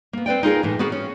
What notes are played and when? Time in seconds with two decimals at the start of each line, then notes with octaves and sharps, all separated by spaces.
0.13 A#3 B3
0.26 C4 B4 D5 G5
0.43 D#4 F4 G#4 A#4
0.63 A2 E3
0.79 B3 C4 F#4 G#4 A#4
0.92 C#4